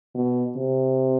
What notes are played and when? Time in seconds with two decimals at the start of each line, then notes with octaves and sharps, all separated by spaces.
0.15 B2
0.56 C3